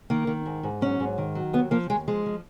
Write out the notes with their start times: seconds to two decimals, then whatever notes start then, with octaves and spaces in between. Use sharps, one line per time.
0.10 D#3 A#3
0.27 D#3
0.46 G#2
0.63 G#2
0.81 F#3 C#4
1.00 G#2
1.18 D#3
1.35 F#3
1.53 D#2 B3
1.71 F3 A#3
1.89 D#2 G#3
2.08 F3 G#3
2.26 F3